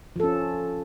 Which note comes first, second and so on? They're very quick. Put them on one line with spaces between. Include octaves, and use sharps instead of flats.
F3 A4 C#4